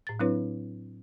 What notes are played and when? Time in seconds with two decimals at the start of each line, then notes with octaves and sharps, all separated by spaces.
0.07 A2 A6
0.20 F#3 C4 D4 E4 B4 C#5